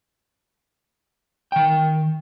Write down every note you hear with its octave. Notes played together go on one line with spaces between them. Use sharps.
D#3 G5